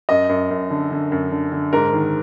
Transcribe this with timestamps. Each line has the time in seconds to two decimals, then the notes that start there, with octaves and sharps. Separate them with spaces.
0.09 F#2 D#5
0.29 F#2
0.51 F#2
0.70 D3
0.91 D3
1.12 F#2
1.31 D3
1.52 D3
1.73 G#2 A#4
1.93 D#3